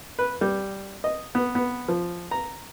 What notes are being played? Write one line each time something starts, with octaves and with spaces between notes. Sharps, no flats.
B4
G3
D#5
B3
B3
F3
A#5